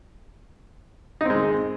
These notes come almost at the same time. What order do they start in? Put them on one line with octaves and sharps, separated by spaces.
D#4 C4 G#3 D#3